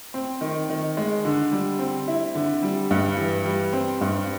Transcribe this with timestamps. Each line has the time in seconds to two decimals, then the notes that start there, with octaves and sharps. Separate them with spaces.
0.14 C4
0.41 D#3
0.70 D#3
0.97 G#3
1.25 D3
1.52 G3
1.79 C4
2.08 E4
2.35 D3
2.63 G3
2.91 G2
3.17 E3
3.45 G3
3.73 C4
4.01 G2